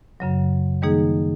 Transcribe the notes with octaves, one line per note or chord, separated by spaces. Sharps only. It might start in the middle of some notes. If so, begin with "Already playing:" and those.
F#2 C#3 F#3
D#3 G3 A#3 D#4 G#4